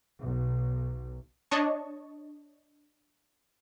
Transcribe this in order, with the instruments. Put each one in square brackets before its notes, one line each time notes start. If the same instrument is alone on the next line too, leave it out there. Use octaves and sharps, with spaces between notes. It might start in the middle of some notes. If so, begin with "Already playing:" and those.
[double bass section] B1
[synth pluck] D4 C#5 D#5 A5 C#6